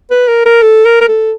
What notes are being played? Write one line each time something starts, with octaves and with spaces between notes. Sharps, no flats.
B4
A#4
A#4
A4
A#4
A#4
A4